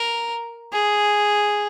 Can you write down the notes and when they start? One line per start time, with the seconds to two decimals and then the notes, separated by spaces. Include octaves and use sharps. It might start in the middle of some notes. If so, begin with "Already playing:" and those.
Already playing: A#4
0.73 G#4